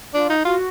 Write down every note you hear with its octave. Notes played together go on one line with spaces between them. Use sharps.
D4 F4
D#4
F4 F#4